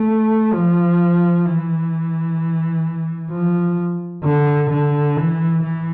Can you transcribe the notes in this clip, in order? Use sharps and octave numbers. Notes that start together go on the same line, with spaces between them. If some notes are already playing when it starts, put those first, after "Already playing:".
Already playing: A3
F3
E3
F3
D3
D3
E3
E3